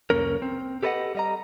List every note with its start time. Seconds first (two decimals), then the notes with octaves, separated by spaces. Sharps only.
0.10 C2 F2 A#3 C#4 A#4
0.42 C4
0.83 G4 A4 B4 D5 D#5 F#5
1.15 G3 D#5 A#5